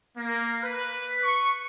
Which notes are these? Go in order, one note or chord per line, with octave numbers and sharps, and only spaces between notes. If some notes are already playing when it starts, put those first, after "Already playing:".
A#3
B4
C#6